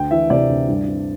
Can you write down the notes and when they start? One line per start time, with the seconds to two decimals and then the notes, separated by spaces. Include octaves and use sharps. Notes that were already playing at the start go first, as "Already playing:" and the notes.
Already playing: D2 G5
0.11 E3 E5
0.30 C3 D5
0.49 D2
0.68 G2
0.87 C4